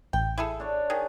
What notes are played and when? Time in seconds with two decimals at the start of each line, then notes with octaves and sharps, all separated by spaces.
0.13 A1 G5
0.38 E4 G#4 A4
0.60 D4 C#5
0.90 D#3 G#4